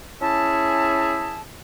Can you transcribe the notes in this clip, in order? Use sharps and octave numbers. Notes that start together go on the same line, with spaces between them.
C#4 E4 G#4 E5 A5